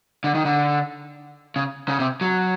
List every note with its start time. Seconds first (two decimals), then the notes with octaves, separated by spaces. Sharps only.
0.24 D3
0.35 D#3
0.45 D3
1.56 C#3
1.88 C#3
2.00 C3
2.21 F#3